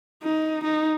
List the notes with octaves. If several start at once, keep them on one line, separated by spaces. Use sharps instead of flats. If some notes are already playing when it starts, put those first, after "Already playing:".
D#4
D#4